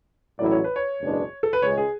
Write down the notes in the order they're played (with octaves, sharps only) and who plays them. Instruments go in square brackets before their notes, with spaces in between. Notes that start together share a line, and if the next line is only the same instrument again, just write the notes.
[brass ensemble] A1 A2 F#3 A3 E4 [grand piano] D5
[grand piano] C#5
B4
C#5
[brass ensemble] F#1 E2 B2 G#3 D4
[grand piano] A4
B4
[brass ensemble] C#2 C#3 G#3 [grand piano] C#5
[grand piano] G#4